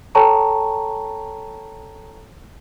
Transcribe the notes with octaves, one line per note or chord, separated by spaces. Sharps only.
A4 C#5 G5 A5 A#5 C#6